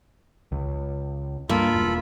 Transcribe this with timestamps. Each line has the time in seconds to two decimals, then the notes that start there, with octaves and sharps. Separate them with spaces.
0.52 C#2
1.49 G2 A#3 F4 A4 B5
1.74 E1